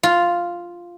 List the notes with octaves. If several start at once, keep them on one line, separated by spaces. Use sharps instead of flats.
F4